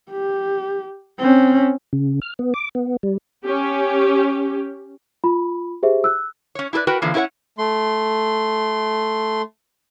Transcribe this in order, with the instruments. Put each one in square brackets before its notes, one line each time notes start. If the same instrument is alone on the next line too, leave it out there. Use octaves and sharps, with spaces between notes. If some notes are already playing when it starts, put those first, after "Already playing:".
[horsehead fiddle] G4
C4 C#4
[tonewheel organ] C#3
F6
B3
D6
B3
G3
[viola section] C#4 G4
[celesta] F4 B5
G4 G#4 C5 E5
E6 F#6
[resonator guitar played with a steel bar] C#4 C#5
E4 G4 A4 B4 D5
F#4 A#4 B4 G5
D3 E3 F3 A#3
C#4 E4 F#4 B4 C#5 F#5
[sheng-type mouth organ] A3 C6